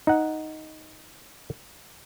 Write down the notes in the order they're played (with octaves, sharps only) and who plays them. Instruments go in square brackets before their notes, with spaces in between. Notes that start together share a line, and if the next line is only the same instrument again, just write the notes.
[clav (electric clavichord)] D#4 F#5